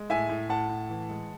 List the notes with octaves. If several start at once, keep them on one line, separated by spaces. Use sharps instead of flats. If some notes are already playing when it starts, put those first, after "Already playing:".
Already playing: G#3
A2 E5 G#5
A2
A2 F#5 A5
A2
E3
G#3